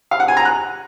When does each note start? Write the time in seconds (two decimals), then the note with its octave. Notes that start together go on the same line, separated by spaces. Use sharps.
0.11 F5
0.20 F#5
0.28 G#5
0.37 A#5
0.45 F#6